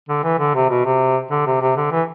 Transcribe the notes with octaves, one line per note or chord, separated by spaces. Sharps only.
D3
E3
D3
C3
B2
C3
D3
C3
C3
D3
E3